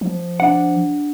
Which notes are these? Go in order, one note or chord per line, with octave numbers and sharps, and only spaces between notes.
F3
D4 F#5